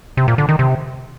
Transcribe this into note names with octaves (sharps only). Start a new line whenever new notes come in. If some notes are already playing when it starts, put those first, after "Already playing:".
C3
A#2
D3
D#3
C3